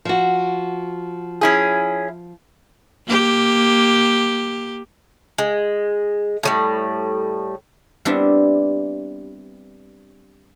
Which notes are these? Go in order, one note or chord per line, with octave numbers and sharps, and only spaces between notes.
F3 F#4
C#4 E4 G#4
A#3 G4
G#3
A2 F#3 G3
G3 B3 C4 D4 E4 G4